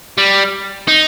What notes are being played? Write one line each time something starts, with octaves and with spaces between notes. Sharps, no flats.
G3
D#4